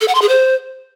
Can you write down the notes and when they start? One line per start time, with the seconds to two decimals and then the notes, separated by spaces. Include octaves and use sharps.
0.01 A4
0.08 F#5
0.15 C6
0.22 G#4
0.29 C5